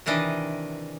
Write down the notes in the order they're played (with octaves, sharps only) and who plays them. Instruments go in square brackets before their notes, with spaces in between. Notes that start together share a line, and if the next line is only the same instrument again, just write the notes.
[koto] C3 D#3 E3 D4 D#5